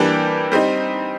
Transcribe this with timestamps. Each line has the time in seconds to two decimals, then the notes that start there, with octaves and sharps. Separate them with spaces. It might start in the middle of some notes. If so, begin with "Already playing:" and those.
Already playing: E3 G3 A#3 D4 G4
0.52 G3 C4 D#4